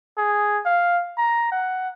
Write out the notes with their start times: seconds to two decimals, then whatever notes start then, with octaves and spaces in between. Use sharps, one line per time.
0.18 G#4
0.66 F5
1.17 A#5
1.52 F#5